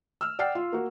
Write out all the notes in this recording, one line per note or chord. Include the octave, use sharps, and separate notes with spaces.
E6 F6
D5 F#5 G5 F6 C7
F4
A#3 F#4